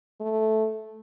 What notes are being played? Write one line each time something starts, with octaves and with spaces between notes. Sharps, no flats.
A3